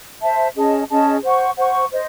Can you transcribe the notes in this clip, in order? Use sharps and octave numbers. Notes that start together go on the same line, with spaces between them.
C5 E5 A5
C#4 G#4 D#5 A5
C#4 G#4 D#5 A5
C5 F#5 C#6
C5 F#5 C#6
C5 D#5